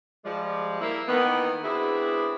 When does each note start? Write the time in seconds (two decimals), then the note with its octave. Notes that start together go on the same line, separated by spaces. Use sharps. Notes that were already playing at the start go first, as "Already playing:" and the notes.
0.25 F3 G3 G#3
0.80 A#3 E4
1.08 D#3 E3 A#3 B3
1.64 B3 C4 D4 E4 F#4 G#4